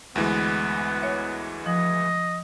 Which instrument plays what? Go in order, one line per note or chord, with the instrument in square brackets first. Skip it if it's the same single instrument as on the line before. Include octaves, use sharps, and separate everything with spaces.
[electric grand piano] D2 E3 G#3 [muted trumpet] B3
[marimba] C#5 E5
[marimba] F3 [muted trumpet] D#5